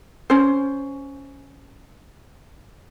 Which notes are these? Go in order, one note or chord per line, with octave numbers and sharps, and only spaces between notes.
C#4 C5